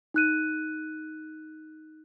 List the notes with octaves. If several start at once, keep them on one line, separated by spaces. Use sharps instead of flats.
D#4 F#6 D#7